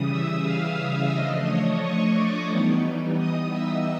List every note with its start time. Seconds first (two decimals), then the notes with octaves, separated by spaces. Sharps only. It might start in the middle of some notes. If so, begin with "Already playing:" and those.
Already playing: C#3 E3 G3 D#6
0.10 E5 E6
0.44 F5 F6
1.13 F3 A3 D4 D#5 D#6
1.47 C#5 C#6
1.81 C#5 C#6
2.15 D5 D6
2.50 E3 G3 B3 D#4
3.18 D#5 D#6
3.53 E5 E6